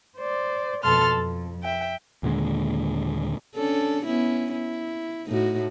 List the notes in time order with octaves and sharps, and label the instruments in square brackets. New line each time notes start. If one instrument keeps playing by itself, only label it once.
[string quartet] C5 D5
F2 B2 A4 A5 C6 F6
F2
E5 G5
[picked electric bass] D#2 A#2 D3 G#3
[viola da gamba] C#4 D4 A4
B3 C#4 E4
E4
A2 D#4 F#4